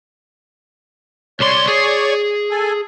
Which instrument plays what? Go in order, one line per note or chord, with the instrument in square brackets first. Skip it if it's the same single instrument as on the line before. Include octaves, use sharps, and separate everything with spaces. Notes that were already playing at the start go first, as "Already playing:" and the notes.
[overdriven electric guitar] C2 C6 [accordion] C#5 D5 C#6
[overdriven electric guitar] G#4
[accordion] A4 G#5